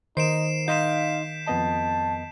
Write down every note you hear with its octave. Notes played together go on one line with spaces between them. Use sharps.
D#3 D#4 C5 C7 D7 E7
D#4 D#5 F5 C6 G6 B6 E7
F2 B3 D#5 A5